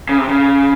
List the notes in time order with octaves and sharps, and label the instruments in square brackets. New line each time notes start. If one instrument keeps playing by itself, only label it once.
[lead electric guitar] C#3
C3
C#3